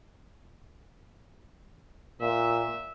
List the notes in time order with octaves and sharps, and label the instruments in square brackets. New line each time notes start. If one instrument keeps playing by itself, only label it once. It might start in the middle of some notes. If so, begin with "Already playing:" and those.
[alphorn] A#2 [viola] E5